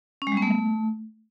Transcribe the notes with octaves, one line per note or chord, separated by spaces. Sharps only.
C#4
G#3
G3
B3
A3